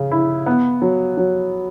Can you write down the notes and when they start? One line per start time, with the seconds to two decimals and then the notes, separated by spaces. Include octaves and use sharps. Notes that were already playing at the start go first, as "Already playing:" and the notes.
Already playing: C#3
0.11 E4
0.46 B3
0.82 F#3
1.17 F#3